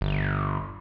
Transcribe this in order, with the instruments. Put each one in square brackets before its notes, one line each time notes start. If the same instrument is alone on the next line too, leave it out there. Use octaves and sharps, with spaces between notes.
[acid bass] G1